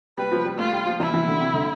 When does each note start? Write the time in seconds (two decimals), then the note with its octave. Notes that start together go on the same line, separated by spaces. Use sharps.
0.18 G3 B4
0.32 F3
0.45 G3
0.58 A3 F4
0.73 G3
0.86 F3
1.00 E3 E4
1.14 E3
1.27 D3
1.41 C3
1.54 D3